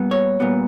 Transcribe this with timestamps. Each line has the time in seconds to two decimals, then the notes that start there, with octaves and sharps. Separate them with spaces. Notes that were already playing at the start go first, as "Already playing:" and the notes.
Already playing: A#2 G3 B3
0.11 C#5
0.40 A#2 G3 B3